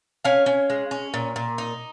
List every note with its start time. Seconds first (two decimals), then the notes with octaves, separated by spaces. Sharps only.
0.25 C#4 F5 G#5
0.46 C#4
0.70 G#3
0.91 C#4
1.14 A#2
1.36 A#2
1.58 D#4